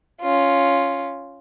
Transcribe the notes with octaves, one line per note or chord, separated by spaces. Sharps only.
C#4 F4